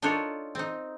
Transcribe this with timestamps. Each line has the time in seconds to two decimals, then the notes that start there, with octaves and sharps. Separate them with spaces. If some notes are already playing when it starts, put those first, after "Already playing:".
0.02 D4 D#4 F4 A4 A#4 C#5
0.55 C4 D#4